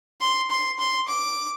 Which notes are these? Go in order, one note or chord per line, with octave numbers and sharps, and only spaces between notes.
C6
C6
C6
D6